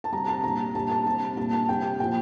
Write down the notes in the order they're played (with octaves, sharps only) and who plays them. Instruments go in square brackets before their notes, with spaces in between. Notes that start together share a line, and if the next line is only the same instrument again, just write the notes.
[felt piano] A5
C3 G3 A#5
A5
A#2 G3 A#5
A#2 G3 A5
A5
C3 G3 A5
A#2 G3 A5
A5
C3 G3 G5
A#2 F3 G5